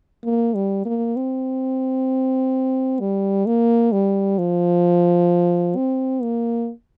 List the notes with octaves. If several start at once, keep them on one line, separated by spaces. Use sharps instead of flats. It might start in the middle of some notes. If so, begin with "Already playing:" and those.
A#3
G3
A#3
C4
G3
A#3
G3
F3
C4
A#3